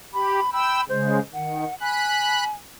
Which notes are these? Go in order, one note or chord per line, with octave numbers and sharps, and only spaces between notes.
G4 B5
G5 B5 E6
C#3 G#3 C5
D#3 F#5
G#5 B5 F#6